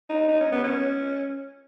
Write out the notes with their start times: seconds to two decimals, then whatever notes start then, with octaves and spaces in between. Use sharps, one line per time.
0.09 D#4
0.28 D#4
0.40 C#4
0.52 B3
0.64 C#4